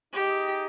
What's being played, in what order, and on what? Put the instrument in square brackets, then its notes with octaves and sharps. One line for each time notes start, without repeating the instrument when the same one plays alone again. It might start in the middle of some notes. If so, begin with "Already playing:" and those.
[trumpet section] D#4 G#4 D#5 G5 [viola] G4